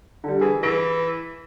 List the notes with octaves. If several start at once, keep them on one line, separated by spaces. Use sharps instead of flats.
D3 G3
E3 G#4
E3 A#6 D7